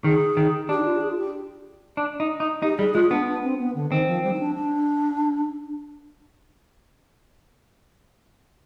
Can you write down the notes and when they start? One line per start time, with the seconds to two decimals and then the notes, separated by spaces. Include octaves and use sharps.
0.04 D#3 G#4
0.37 D#3
0.69 D4 G4
0.78 D#4
0.85 F4
0.95 G4
1.01 G#4
1.10 F4
1.18 G4
1.97 D4
2.20 D#4
2.40 D#4
2.62 D#4 G4
2.78 G3 G#4
2.94 G#3 F4
3.10 B3 D4
3.27 D4
3.43 C4
3.59 B3
3.75 D3
3.91 D#3 C4
4.07 F3
4.24 G3
4.33 D#4
4.39 D4
4.55 D4